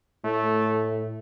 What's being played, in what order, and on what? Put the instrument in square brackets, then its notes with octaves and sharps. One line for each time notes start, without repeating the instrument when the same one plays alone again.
[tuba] A2 [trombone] A3